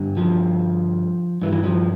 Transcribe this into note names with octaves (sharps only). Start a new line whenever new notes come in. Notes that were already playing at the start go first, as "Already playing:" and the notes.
Already playing: G2 D3
F3
G2 E3
E3
F3